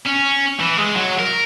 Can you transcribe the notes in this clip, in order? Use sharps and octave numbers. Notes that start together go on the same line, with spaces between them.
C#4
E3
G#3
F#3
A#4